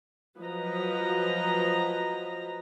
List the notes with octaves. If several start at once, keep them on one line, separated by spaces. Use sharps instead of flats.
F3 F#3 B4 D#5 A#5